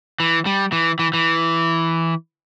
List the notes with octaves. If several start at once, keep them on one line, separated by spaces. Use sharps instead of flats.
E3
G3
E3
E3
E3